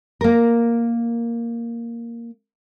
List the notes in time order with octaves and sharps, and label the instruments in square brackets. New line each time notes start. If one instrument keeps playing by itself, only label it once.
[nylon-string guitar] A#3 A#4